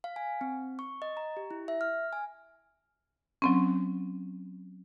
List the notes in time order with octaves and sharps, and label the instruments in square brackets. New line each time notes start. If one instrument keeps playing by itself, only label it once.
[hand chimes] F5
G#5
C4
C#6
D#5
A#5
G4
E4
E5
F6
G#5
[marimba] F#3 C4 C#4